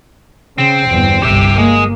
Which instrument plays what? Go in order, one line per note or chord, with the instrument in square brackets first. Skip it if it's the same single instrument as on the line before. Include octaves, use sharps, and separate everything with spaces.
[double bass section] C#3 [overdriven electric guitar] C4
[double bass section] G1 E2
[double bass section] G1 C2 [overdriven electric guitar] G4 E5
[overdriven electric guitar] G#3 [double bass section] A#3